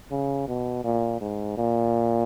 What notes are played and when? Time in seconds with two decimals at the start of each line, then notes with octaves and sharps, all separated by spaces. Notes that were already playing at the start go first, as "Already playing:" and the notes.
0.11 C#3
0.48 B2
0.84 A#2
1.21 G#2
1.57 A#2